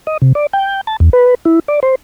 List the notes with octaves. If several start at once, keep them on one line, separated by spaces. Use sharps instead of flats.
D#5
C3
D5
G5
A5
E2
B4
E4
D5
C5